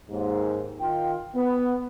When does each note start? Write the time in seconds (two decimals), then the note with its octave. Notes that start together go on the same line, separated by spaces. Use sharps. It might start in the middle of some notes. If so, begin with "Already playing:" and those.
0.10 D#2 G#2
0.80 D#3 F4 G5
1.35 B3